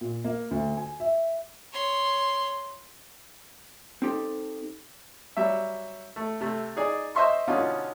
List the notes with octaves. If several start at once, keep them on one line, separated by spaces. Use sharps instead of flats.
A#2
A#3
D2
G#5
E5
C#5 C6
C4 D#4 G4 A4
F#3 G3 E5
A3
C3 A3
D#4 G#4 D5
C5 D#5 E5 C6 C#6
B2 D3 C#4 D#4 F4